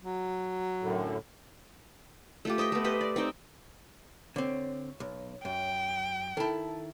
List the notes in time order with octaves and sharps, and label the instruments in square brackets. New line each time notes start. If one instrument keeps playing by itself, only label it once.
[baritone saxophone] F#3
[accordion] F#2 A2 D3
[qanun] A3 F4 G4
C5 D#5 E5 G5
A3 B3
G4 B4 C5 D#5
D5
C4 D#4 G5
[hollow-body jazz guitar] D3 C4 [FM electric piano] C#5
[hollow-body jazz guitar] B1
[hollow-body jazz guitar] F#2 [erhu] G5
[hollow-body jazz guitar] D#3 E4 [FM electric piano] A4 A5